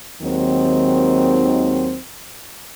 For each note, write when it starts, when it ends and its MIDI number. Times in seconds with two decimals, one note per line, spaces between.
0.22 1.97 39
0.22 1.97 51
0.22 1.97 54
0.22 1.97 56
0.22 1.97 60